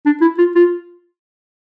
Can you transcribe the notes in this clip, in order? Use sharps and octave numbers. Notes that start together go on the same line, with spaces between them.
D4
E4
F4
F4